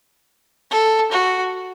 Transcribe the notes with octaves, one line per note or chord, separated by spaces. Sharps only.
A4
F#4